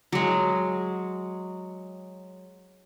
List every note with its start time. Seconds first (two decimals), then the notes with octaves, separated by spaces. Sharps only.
0.12 F#3 G#3